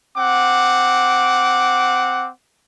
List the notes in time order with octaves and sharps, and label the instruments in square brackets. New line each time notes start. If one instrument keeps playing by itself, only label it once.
[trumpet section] C4 F#5 D6